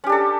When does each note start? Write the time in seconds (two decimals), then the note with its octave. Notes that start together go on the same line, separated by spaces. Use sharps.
0.04 C#4
0.06 G4
0.09 D4
0.12 A4